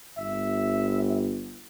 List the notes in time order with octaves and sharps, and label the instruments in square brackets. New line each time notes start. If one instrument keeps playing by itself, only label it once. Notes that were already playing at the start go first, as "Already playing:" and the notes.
[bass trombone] G1 [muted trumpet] E5